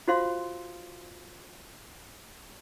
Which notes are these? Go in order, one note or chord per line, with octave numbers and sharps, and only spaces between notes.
F4 F#4 C5 F5 C6